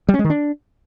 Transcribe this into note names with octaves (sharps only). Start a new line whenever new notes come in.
G3
C#4
G#3
D#3
D4